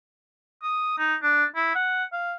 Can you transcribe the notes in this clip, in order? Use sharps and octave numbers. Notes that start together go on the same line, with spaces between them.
D#6
D#4
D4
E4
F#5
F5